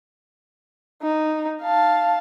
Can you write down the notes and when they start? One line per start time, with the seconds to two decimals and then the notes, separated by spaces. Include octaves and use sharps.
1.02 D#4
1.63 F5 A5